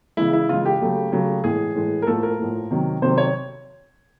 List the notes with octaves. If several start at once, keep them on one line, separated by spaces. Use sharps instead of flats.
C#3 E3 G#3 E4
E4
C#3 E3 G#3 F4
G4
C#3 F#3 A3
C#3 F#3 A3
A2 E3 G#3 G#4
A2 E3 G#3
A#4
A2 F3 A3 A4
A#4
A2 F3 A3
C3 D#3 F#3
C3 D#3 F#3 C5
C#5